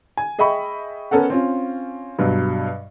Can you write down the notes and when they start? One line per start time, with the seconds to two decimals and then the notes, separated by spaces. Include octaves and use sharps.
0.17 G#5
0.39 G#4 D#5 E5 G5 B5 C#6
1.11 B3 C#4 A4 A#4 F#5
1.30 C4 C#4 F4
2.18 G2 B2 F#3